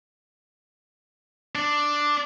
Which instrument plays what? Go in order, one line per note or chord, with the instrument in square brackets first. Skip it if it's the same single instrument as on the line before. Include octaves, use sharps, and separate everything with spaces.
[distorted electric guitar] D4